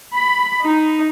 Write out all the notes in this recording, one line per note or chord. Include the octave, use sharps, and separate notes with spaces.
B5
D#4